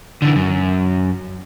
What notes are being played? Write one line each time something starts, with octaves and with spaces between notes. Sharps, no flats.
D3 E3
F#2